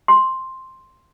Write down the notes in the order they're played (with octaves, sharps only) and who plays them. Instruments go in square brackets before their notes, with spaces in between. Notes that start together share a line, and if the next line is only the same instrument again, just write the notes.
[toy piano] C6